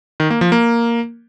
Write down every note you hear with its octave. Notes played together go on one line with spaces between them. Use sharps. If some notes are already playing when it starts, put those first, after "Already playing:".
D#3
A#3
F3
A#3